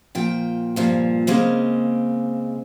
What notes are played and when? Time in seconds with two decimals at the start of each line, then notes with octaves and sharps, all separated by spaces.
0.15 A#2 F3 G5
0.76 G2 A#2 F3
1.27 C#3 G#3 A#3 C4